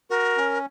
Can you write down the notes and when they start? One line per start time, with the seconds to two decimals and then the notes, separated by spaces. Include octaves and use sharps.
0.10 F#4 A#4
0.37 C#4